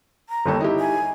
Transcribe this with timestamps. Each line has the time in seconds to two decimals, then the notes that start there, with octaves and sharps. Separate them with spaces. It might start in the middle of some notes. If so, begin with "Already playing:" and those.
0.29 A#5
0.46 G1 D#2 A4
0.60 D#4 E4 G4
0.80 G#5